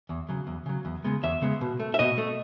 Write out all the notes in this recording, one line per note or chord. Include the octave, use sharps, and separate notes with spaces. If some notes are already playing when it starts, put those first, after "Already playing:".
E2
C#3 F#3
E2
C#3 F#3
E2
C#3 G#3 B3
E2 E5
C#3 G#3 B3
B2
A3
E5
B2 D#5
A3